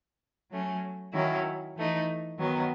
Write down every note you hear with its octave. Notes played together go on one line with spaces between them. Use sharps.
F#3 A3 C#4
D#3 F#3 C#4 E4
E3 A3 D#4
D#3 F#3 B3